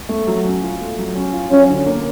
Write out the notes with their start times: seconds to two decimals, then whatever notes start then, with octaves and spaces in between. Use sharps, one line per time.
0.09 A3
0.27 F#3
0.44 C#4
0.62 F4
0.81 A3
0.98 F#3
1.15 C#4
1.33 F4
1.51 F#3 C#4
1.69 D3
1.86 A#3